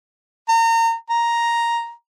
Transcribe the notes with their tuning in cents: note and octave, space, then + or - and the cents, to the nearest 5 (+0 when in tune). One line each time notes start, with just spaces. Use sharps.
A#5 -30
A#5 +5